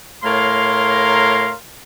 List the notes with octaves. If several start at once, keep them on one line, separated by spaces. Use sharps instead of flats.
A2 A#4 C#5 F5 A#5 C6